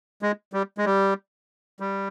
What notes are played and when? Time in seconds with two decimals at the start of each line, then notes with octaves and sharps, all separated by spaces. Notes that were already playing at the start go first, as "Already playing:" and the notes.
0.22 G#3
0.53 G3
0.78 G#3
0.85 G3
1.80 G3